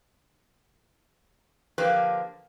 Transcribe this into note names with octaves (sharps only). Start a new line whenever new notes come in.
D3 F3 A#3 G4 B4 C5